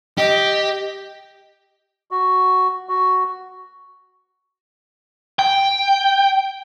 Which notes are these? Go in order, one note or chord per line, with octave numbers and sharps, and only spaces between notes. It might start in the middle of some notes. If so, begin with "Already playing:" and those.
G4 D#5
F#4
F#4
G5